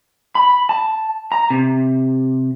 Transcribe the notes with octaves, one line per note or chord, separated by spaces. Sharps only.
B5
A5
A#5
C3